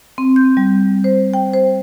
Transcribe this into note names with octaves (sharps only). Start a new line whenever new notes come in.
C4
G6
G3
C5
G5
C5